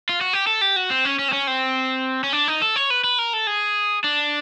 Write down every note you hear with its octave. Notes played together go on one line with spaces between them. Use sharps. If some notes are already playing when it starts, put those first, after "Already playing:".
F4
F#4
G4
A4
G4
F#4
C4
C#4
C#4
C4
C#4
C4
C#4
D4
D#4
A4
C#5
B4
B4
A#4
A4
G#4
D4